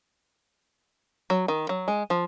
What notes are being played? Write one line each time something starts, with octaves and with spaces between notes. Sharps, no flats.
F#3
D#3
F#3
G#3
F3